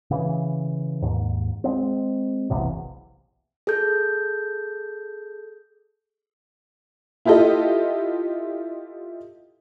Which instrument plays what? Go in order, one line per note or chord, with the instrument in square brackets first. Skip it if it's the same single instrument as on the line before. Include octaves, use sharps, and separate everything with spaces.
[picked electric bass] C#3 E3
D#2 G#2
G#3 A#3 C4
F#1 B1 E2 C3
[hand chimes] G#4 A4 G6
[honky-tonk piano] E4 F4 G4 A4 D#5